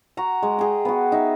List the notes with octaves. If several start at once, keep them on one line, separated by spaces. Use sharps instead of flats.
F#4 A#5
G#3
G#4 G5
B3 F#4
D#4 E5